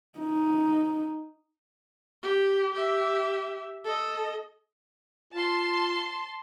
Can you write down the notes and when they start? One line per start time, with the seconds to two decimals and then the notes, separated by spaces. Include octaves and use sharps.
0.19 D#4
2.23 G4
2.74 G4 E5
3.84 A4 D#5
5.33 F4 A5 C6